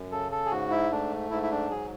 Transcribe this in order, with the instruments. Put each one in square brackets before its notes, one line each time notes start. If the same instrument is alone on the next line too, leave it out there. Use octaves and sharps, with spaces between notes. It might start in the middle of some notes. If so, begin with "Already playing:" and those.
Already playing: [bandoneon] F#2
C#3 A4
A4
G#4
G#2 F#4
E4
A3 D4
G#2 E4
E4
D4
F#3 G#4